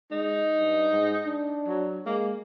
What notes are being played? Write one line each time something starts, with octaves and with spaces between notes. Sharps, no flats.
G#3 D#4
G2
G#2
D4
F#3
G#3 A#3